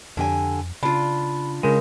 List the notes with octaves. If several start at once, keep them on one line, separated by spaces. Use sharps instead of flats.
F2 D3 G4 G#5
C#3 D4 F4 B5
C#3 G#3 A#4